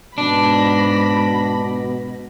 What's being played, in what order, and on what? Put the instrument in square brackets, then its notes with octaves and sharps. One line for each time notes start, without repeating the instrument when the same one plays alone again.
[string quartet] G#2 B5 A#6 [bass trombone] B2 [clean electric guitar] D4